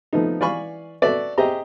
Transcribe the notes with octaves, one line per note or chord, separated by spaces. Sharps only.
F3 A3 B3 D#4
E3 D5 F5 G#5 B5 C#6
F#4 A4 B4 D5 E5
G4 G#4 C5 D#5 E5 A#5